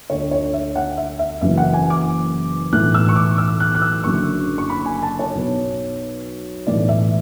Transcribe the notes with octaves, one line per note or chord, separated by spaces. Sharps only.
D2 D3 C#5
C#5
E5
F#5
E5
E5
F#1 F#2 C#3 E3 E5
F#5
G#5
D6
B1 A2 E3 F#6
E6
C#6
D6
E6
F#6
F#6
E6
F#1 F#2 D3 C#6
C#6
B5
G#5
A5
C#5
B1 B2
B1 A2 E3 D5
E5